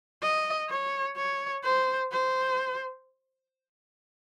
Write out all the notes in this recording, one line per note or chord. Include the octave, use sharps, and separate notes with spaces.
D#5
C#5
C#5
C5
C5